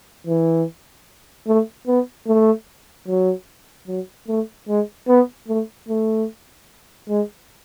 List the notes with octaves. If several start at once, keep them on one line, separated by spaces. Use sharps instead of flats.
E3
A3
B3
A3
F#3
F#3
A3
G#3
B3
A3
A3
G#3